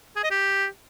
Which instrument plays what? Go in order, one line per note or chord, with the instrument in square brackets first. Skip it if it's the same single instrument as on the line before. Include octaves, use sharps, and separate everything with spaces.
[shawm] G#4
D#5
G4